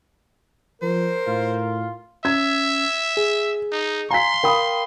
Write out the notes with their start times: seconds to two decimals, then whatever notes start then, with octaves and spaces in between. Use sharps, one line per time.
0.82 F3 A#4 C5
1.27 A2 F4
2.25 C#4 E5 G#6
3.17 G#4
3.72 D#4
4.11 F5 G#5 A#5 C6 B6
4.44 A#4 F5 G5 B5 D#6